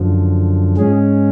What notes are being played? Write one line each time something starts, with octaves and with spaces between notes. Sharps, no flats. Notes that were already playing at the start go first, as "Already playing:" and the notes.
Already playing: F#2 D3 F3
G#2 G#3 C#4 G#4